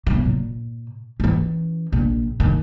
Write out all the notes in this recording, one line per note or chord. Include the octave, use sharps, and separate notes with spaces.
F#3 B3
A#2
E3 C#4
A#1
D#3